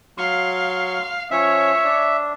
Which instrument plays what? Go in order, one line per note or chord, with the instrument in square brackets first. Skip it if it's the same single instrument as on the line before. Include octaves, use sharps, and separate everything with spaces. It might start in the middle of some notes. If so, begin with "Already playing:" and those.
[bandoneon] F#3 C6 C#6 [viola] F5
[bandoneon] F3 C#4 [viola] C#5 [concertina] E5
[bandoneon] D4